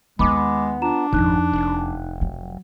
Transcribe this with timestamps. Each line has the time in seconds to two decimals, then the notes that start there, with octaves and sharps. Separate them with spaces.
0.19 D#2 D#3 G#3 B3 B5 D6
0.82 D4 F4 A#5 E7
1.13 G#1 F2 D#4 F#6
1.53 F1
2.21 F#3